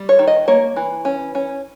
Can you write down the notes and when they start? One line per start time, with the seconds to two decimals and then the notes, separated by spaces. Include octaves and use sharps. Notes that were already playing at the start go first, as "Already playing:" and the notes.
Already playing: G3
0.09 C#5
0.19 D#3
0.27 D#5
0.48 A#3 C#5
0.76 E3
1.05 C#4
1.35 C#4